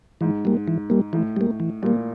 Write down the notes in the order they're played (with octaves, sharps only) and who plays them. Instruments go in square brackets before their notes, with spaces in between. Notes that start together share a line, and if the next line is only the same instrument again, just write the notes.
[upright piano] G#2 [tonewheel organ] E3
[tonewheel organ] G3 A#3
E3
G3 A#3
[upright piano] A2 [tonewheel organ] E3
[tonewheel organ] G3 A#3
E3
[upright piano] A#2 [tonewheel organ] G3 A#3